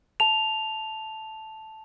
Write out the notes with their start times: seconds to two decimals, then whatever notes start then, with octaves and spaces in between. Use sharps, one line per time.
0.20 A5 F7